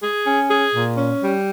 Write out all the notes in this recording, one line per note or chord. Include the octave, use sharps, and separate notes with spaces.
G#4
C#4
G#4
A#2
C#4
G3